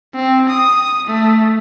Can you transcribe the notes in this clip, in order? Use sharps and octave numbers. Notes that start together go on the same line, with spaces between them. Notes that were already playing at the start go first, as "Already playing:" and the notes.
C4
D#6
A3